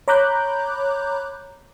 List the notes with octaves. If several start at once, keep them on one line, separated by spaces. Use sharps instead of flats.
C#5 A#5 B5 D6 F#6 G6